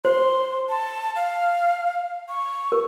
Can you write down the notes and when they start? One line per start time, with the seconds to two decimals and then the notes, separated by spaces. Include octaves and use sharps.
0.05 C5 C6
0.69 A5
1.16 F5
2.29 C#6
2.72 A#4